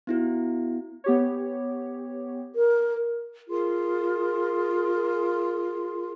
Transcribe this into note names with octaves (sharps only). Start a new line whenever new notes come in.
B3 E4 F#4
B3 G4 C#5
A#4
F4 G#4 A#4 C6